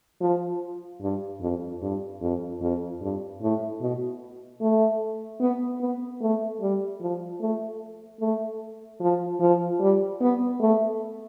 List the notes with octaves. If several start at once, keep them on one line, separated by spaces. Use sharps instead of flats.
F3
G2
F2
G2
F2
F2
G2
A2
B2
A3
B3
B3
A3
G3
F3
A3
A3
F3
F3
G3
B3
A3